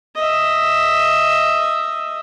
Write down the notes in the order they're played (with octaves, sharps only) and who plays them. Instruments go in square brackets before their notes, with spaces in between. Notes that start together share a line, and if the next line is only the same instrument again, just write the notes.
[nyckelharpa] D#5 E5